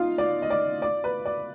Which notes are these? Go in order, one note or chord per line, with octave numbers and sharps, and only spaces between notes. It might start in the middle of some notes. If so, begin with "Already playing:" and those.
Already playing: D#4 F4 F5
D5
D#5
D5
D5
B4
D5